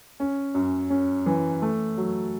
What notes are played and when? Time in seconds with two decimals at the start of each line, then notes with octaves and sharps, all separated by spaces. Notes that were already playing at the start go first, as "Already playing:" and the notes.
0.20 C#4
0.54 F#2
0.90 C#4
1.26 E3
1.62 A3
1.98 F#3